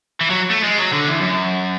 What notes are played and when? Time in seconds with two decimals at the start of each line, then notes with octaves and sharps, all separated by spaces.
0.21 E3
0.30 F#3
0.50 A3
0.63 G#3
0.78 F#3
0.93 D3
1.07 E2
1.21 F#2